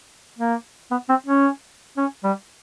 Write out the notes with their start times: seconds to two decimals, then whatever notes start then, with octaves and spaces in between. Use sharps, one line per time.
0.38 A#3
0.91 B3
1.09 C4
1.26 C#4
1.97 C#4
2.24 G3